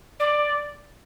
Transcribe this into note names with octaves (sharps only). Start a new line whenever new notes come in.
D5